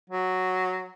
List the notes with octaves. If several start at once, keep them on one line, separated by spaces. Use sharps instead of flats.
F#3